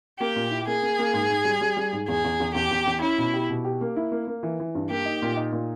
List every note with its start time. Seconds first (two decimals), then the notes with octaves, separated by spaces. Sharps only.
0.20 A#3 G4
0.36 A#2
0.51 E4
0.67 A#3 G#4
0.82 A#3
0.99 A#3
1.13 G#2
1.30 G#2
1.45 G3
1.61 G3
1.77 G3
1.92 G#2
2.08 E2 G#4
2.24 E2
2.40 E2
2.55 E2 G4
2.71 E2
2.86 E2
3.02 C#4 E4
3.18 B2
3.33 G4
3.50 B2
3.65 G4
3.81 A#3
3.96 E4
4.12 A#3
4.27 A#3
4.43 E3
4.60 E3
4.75 G2
4.90 A#3 G4
5.05 D#4
5.22 A#2
5.37 D#4
5.53 A#2